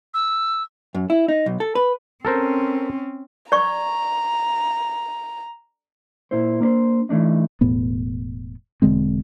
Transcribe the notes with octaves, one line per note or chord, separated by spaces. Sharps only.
E6
F#2
E4
D#4
B1
A4
B4
C4 C#4 A4 A#4 C5
D5 A#5 C#6
A#2 E4 C5
A#3 D4 B4 C5
E3 A3 D4 D#4
E1 A2 B3
E1 D3 G#3 C4